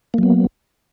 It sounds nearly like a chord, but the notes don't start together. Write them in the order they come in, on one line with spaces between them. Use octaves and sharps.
A#3 F#3 B3